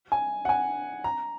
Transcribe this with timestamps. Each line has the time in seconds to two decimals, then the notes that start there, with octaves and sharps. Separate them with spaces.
0.12 G#5
0.45 F#5
0.49 G#5
1.04 A#5